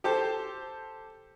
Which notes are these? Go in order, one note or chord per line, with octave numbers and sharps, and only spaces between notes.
G4 A4 C5